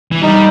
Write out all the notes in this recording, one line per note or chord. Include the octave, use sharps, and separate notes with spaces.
E3
G3 D#4